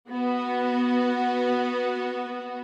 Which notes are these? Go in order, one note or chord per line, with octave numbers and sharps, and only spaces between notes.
B3 F#4